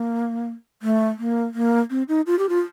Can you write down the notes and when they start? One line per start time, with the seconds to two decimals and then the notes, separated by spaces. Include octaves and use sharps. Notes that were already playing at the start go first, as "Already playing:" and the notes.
Already playing: A#3
0.82 A3
1.19 A#3
1.54 A#3
1.90 C4
2.09 D#4
2.27 F4
2.39 G4
2.49 F4